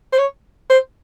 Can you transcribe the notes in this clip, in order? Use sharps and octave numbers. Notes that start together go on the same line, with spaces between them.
C5
C#5
C5